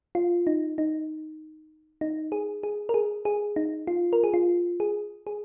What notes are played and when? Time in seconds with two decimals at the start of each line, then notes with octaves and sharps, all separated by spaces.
0.15 F4
0.47 D#4
0.78 D#4
2.01 D#4
2.32 G#4
2.63 G#4
2.89 A#4
2.94 G#4
3.25 G#4
3.56 D#4
3.87 F4
4.13 A#4
4.24 G#4
4.34 F4
4.80 G#4
5.27 G#4